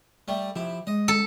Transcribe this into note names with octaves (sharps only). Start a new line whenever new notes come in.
G3 A3
F3 E4 G4 E5
G#3 D#5
A4